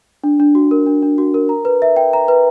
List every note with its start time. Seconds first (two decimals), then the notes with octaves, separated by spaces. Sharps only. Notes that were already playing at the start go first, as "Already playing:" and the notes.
0.24 D4
0.40 D4
0.55 F#4
0.71 A#4
0.86 D4
1.02 D4
1.18 F#4
1.34 A#4
1.49 A#5
1.65 B4
1.82 E5
1.96 G5
2.13 A#5
2.28 B4